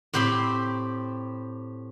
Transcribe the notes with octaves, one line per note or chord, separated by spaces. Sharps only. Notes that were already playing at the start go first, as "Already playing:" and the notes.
A2 C4 G4 B5 C6